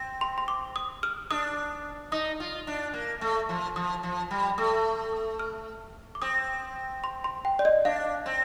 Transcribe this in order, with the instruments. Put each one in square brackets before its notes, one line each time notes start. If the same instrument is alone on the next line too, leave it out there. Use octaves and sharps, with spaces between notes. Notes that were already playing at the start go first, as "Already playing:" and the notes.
Already playing: [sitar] C4
[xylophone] C6
C6
D6
D#6
F6
[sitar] D4 [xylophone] D#6
[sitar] D#4 [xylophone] D#6
[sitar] F4
D4
A#3
A3
F3
[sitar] F3 [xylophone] D#6
[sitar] F3
G3
[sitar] A3 [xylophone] D#6
[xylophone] D6
D#6
F6
D6
[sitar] C4 [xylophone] D#6
[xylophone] C6
C6
G5
D5
D#5
[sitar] D4 [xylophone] F5
[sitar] C4